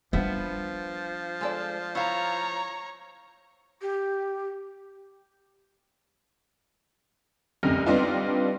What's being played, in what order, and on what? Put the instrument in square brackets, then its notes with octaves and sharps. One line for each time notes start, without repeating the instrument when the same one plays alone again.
[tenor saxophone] F3 [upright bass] G3 D4 [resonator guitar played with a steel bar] B3 E5
[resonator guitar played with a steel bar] G#3 A4 D5
[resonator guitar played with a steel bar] E4 F5 [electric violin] C#5 A#5
[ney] G4
[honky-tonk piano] F1 C2 F#2 D3 F6 A#6
G3 B3 C4 D4 D#4 F4